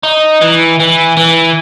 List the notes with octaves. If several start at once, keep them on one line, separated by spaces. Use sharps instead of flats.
D#4
E3
E3
E3